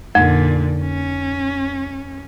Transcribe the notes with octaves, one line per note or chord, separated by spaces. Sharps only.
F2 A#2 D3
C#4